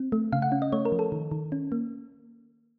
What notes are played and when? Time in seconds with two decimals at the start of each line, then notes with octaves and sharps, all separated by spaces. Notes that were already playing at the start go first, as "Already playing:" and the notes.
Already playing: C4
0.12 A3
0.33 C#3 F5
0.42 F#5
0.52 C#4
0.62 D#5
0.72 A3 C#5
0.85 A#4
0.92 F3
0.99 A4
1.12 D#3
1.32 D#3
1.52 C#4
1.72 A#3